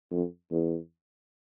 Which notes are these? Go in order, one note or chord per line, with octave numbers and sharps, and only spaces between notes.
F2
E2